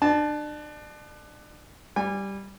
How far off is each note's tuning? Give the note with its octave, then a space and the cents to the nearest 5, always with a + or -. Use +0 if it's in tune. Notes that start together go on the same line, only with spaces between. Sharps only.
D4 +35 A5 -15
G3 +0 G#5 -30